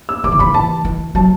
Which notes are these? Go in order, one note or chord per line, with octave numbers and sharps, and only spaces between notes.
E6
E3 D6
D3
E3 B5
E3 A5
E3
F#3 A5